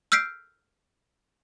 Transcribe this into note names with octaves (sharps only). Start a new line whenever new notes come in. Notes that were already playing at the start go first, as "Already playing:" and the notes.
E6 F6 G6 B6 C7 D7